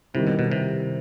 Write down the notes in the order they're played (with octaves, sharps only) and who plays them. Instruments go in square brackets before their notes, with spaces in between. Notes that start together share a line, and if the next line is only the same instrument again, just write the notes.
[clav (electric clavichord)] C3 [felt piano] D#3 G3 C4 E4
[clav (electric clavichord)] B2
B2
C3